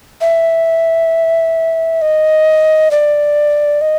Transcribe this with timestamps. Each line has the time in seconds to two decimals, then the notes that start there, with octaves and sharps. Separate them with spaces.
0.21 E5
2.02 D#5
2.91 D5
3.81 D#5